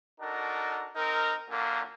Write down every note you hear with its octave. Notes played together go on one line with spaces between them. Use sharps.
D4 D#4 F#4 A4 A#4
C4 D#4 A#4
F#2 A#2 D3 A#3